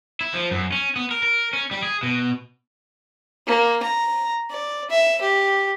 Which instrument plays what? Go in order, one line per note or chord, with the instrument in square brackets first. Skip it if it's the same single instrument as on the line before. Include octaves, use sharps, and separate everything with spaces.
[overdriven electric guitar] E4
F3
F#2
C#4
B3
A#4
A#4
C#4
G3
G#4
B2
[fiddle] A#3
A#5
D5
E5
G4